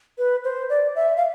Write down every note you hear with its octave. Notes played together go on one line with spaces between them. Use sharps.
B4
C5
D5
E5
F5